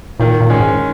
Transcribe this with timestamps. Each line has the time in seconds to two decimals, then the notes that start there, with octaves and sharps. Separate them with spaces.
0.20 A#2 D#3
0.41 A#2
0.50 G#3 C#4
0.60 G#2